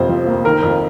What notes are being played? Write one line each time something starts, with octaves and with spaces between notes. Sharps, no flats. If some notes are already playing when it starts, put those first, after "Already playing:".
Already playing: F2 C3 A#3 C5
F3
A#3
D#3 A#4
F2